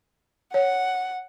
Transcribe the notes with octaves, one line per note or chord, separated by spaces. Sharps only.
C#5 F#5